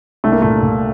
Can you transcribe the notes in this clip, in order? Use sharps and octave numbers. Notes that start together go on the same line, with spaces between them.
C2 A3
A#3
A#2 A3
A#2